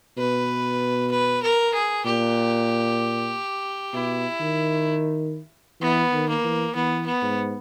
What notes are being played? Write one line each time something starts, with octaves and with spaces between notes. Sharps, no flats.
B2 B4
B4
A#4
G#4
A#2 G4
B2 E4
D#3
E3 B3
D#3
A#3
E3
E3 B3
B3
G#2